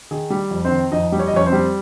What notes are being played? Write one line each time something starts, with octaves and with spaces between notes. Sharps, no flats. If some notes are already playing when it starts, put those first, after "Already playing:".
D#3 G#4
G3
F2
C4 C5
D#3
F2 D#4 D#5
G3
C#5
D#5
F2 C#4 C#5
C4 C5
G3